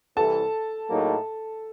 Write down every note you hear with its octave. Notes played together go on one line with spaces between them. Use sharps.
C2 C3 E3 A4 A5
A2 F#3 A#3 D#4 G#4